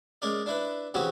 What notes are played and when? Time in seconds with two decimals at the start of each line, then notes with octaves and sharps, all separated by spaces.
0.22 G#3 C#4 A#4 D5
0.46 D4 E4 B4
0.94 C#3 E3 C4 C#4 F#4 G4